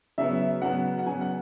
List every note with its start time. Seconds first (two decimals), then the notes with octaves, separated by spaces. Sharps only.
0.18 C#3 F#3 B3 E5
0.62 C#3 F#3 B3 F#5
0.99 F#5
1.06 C#3 F#3 B3 G#5
1.21 F#5